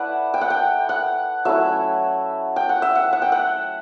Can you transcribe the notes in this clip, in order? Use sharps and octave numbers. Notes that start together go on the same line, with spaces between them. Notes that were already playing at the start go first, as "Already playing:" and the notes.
Already playing: A3 E4 B4 D5 E5 F#5
G5
F#5
G5
F#5
F#3 A3 C#4 E4 E5
G5
F#5
E5
F#5
F#5
G5
F#5